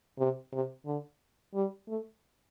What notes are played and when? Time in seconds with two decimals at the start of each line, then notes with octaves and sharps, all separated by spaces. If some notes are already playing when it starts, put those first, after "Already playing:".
0.18 C3
0.52 C3
0.86 D3
1.54 G3
1.88 A3